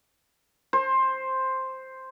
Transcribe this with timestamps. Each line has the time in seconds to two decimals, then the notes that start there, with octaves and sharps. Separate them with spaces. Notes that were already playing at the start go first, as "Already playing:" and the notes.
0.73 C5